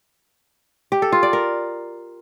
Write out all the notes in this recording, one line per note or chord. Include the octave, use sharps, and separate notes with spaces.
G4
A4
F4
D5
A#4